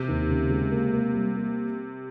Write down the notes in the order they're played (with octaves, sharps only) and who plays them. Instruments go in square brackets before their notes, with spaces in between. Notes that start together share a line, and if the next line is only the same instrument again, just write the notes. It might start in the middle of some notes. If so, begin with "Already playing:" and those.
Already playing: [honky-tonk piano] C3
[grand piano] D#2
C#3
G#3
A#3
A#3
G3
A#3